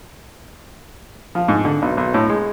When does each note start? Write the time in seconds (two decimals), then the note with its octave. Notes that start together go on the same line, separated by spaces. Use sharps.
1.35 F3
1.48 G#2
1.65 D3
1.82 B1
1.97 B1
2.14 A2
2.30 G#3